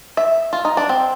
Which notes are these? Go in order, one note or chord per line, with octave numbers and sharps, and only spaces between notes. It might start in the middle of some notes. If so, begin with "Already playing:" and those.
E5
F4
D#4
D4
C4